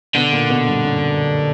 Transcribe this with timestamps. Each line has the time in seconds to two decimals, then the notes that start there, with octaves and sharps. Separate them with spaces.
0.15 B2 D3 B3
0.33 A#2 A#3
0.50 B2 B3
0.66 G2 G3
0.84 F#2 F#3